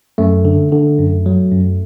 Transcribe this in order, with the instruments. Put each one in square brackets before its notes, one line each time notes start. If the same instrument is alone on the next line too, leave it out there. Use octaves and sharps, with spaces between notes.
[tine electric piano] F#2 A3
D3
D3
F#2
F#3
F#2